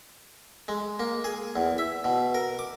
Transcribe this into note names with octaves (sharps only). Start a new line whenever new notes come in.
G#3
A#3
G#4
E2
E5
B2
A#4
D6